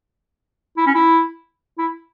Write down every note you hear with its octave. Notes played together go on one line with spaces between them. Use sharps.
E4
C#4
E4
E4